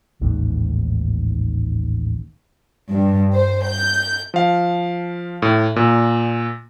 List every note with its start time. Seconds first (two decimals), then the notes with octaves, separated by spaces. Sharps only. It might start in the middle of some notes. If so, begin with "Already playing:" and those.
0.21 A1 D#2 G#2
2.91 G2
3.35 C5
3.66 G6
4.34 F3 F5
5.42 A2
5.76 A#2